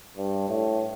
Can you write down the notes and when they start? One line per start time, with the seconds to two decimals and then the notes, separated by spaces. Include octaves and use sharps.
0.17 G2
0.49 A2